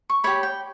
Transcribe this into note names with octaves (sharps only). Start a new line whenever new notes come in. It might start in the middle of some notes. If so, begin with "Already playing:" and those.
C#6
G4 C#5 B5
G5